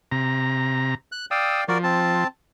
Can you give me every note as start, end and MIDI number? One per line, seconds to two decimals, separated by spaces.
0.12 0.95 48
0.12 0.95 82
1.12 1.26 90
1.31 1.64 74
1.31 1.64 77
1.31 1.64 79
1.31 1.61 87
1.31 1.61 88
1.68 2.24 53
1.68 1.78 66
1.68 1.78 70
1.68 1.78 74
1.83 2.27 60
1.83 2.27 81